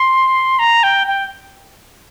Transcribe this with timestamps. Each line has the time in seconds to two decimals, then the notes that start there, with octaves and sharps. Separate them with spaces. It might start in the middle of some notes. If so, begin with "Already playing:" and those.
Already playing: C6
0.59 A#5
0.83 G5
1.07 G5